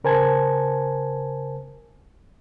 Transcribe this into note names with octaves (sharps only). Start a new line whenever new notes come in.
C#3 A#4 C5 G#5 A5 G#6